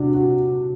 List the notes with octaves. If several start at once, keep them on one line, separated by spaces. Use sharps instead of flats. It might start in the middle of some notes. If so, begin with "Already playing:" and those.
Already playing: C3 D4 F#4
F#4